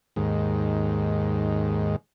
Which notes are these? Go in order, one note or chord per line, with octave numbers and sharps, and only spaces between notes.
D#2 G#2